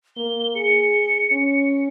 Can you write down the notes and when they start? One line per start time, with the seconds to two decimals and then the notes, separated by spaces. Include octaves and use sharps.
0.17 A#3 G7
0.56 G#4 C#7
1.32 C#4